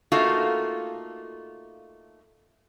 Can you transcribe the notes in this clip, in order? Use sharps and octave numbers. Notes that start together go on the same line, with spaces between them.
A3 A#3 D#4 F4 F#4 A4